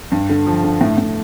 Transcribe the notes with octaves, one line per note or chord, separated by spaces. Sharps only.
G2
D3
F3
D3
A2
A2